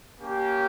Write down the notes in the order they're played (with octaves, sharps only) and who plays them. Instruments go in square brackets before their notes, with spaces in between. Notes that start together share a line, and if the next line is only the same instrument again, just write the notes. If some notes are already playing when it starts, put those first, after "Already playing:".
[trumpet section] A#3 C#4 G4